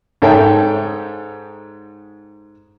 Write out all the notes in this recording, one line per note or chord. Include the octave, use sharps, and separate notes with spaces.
G#2 D#4 A4 C#5 E5 G5